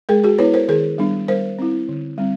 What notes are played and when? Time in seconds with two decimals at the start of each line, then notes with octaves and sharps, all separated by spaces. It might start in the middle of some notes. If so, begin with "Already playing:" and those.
0.09 G#3 G#4 A#4
0.24 F#4 G#4
0.39 B3 E4 B4 C#5
0.53 A#4 C5
0.68 D#3 G#4 A#4
0.98 G3 B3 D4
1.28 G3 A#4 C5
1.59 C4 E4
1.89 D3
2.18 G3 C4